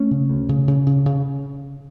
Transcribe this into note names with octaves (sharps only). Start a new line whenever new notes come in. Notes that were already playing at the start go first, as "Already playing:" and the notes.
Already playing: A3 C#4
C#3
D2
C#3
C#3
C#3
C#3